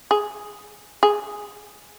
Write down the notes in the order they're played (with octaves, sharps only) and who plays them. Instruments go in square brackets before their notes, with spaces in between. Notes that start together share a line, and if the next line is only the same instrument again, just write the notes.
[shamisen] G#4
G#4